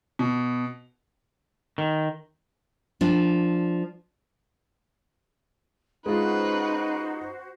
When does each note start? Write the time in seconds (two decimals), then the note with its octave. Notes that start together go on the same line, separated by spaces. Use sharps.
0.19 B2
1.78 D#3
3.01 F3 D4
6.06 G#3 C#4 D#4 F4 F#4 B4 C5